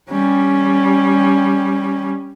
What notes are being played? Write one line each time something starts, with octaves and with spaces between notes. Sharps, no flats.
G3 C#4